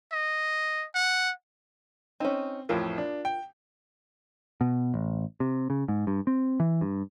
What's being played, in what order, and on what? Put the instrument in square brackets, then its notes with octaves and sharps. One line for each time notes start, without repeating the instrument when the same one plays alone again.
[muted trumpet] D#5
F#5
[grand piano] C4 [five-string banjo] C#4 D#4
[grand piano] A1 F2 A2 [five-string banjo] F4 A#4
[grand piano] D4
G5
[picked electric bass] B2
A1
C3
C#3
G#2
G2
C4
E3
G2